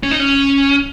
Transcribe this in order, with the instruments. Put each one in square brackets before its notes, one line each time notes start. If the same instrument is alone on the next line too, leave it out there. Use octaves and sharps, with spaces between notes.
[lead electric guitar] C#4
D#4
C#4